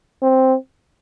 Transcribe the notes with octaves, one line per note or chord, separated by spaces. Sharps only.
C4